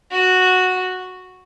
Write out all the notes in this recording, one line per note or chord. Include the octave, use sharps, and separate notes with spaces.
F#4